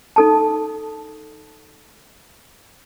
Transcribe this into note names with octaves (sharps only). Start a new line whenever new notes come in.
D#4 A4 A5